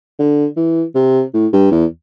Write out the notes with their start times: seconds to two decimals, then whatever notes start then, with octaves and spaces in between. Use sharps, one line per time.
0.19 D3
0.57 E3
0.95 C3
1.34 A2
1.53 G2
1.72 E2